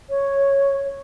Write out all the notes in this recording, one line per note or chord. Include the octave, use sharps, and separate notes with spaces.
C#5